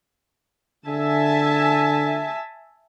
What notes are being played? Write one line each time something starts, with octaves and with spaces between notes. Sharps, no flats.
D3 E5 G#5 A5